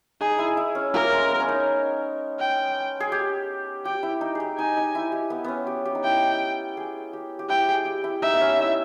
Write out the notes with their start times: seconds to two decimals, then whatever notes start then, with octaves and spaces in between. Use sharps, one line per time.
0.20 D#4 G#4
0.38 E4
0.57 E4
0.75 C#4
0.94 A#3 A#4
1.12 G#3
1.30 B3
1.40 C#4
1.48 D#4
2.39 G5
3.00 G#4
3.12 G4
3.85 G4 G5
4.03 E4
4.21 D#4
4.35 G4 G#4
4.58 D#4 G#5
4.77 D#4
4.95 E4
5.12 G4
5.30 B3
5.44 B3 C#4
5.67 G4
5.85 G4
5.95 D#4
6.04 E4 G5
6.77 G#4
7.13 G4
7.39 G4
7.49 E4 G5
7.68 G#4
7.85 G4
8.04 E4
8.22 D#4 E5
8.33 B3
8.41 C#4
8.59 E4